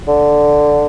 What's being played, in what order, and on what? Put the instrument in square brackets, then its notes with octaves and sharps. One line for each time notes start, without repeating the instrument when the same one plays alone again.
[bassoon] D3